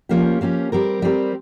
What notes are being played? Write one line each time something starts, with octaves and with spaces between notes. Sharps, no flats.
F3 A#3 C#4 G4
F3 A#3 C#4 G4
G3 C4 G4 A#4
G3 C4 G4 A#4